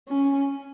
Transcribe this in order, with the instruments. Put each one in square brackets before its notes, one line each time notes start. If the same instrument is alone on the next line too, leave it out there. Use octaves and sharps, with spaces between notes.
[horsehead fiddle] C#4